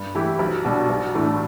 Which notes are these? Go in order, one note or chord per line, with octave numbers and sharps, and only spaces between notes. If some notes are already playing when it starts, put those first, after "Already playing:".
Already playing: G2
E3 A3 E4 G4
B1
B2 G3 D4
B1
A2 E3 A3 D4